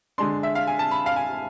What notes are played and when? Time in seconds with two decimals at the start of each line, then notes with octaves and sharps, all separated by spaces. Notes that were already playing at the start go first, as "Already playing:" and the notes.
0.18 D3 G#3 D4 C6
0.43 E5
0.55 F5
0.67 G#5
0.79 A5
0.91 B5
1.06 F5
1.16 G#5